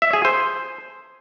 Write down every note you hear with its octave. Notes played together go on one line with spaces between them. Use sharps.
E5
G#4
C5